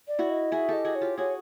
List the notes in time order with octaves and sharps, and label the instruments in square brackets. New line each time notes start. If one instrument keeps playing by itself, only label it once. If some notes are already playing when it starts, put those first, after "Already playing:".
[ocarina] D5
[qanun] E4 F#4
[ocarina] D#5
[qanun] F#4 G#4 [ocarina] E5
[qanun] G4 A4 [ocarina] D#5
[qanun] F#4 G#4
[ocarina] C#5
[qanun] F4 G4
[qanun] F#4 G#4 [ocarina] C#5